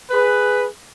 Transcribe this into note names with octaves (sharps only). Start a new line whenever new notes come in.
G#4 B4